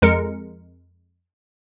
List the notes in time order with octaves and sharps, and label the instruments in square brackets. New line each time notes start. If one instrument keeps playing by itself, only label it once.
[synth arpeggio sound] F2 G#3 A#4 C#7